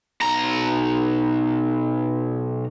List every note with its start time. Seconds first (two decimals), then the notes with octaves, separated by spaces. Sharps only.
0.22 B1 A#5